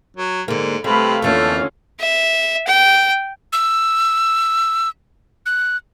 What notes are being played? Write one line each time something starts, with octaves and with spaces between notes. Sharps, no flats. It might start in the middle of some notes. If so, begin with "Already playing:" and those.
F#3
G#2 D3 A#3
C3 G3 A3 B4 F5 B5
F2 D3 E3 A3 A#3 C#4 F4 F5
E5
G5
E6
F#6